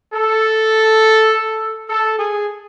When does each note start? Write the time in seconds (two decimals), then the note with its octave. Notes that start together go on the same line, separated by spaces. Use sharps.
0.14 A4
1.90 A4
2.19 G#4